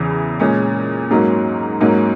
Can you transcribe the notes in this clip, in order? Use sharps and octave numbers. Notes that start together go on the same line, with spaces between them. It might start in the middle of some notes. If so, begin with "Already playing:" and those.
Already playing: E2 C#3 E3
A#2 G#3 C#4
G#2 F#3 A#3 C#4
G#2 F#3 A#3 C#4